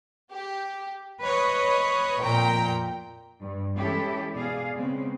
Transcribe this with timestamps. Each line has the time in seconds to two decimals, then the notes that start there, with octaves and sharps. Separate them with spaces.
0.30 G4
1.22 B4 C#5 D#5
2.20 F2 A#2 G5 A#5
3.42 G2
3.78 E3 G#3 C#4 E4 G4 A4
4.33 B2 G#4 D5 F5
4.77 C#3 G#3 B3 C4